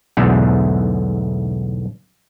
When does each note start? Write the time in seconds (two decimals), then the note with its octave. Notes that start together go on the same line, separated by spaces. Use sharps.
0.17 B1 E2 G#2 D3 A3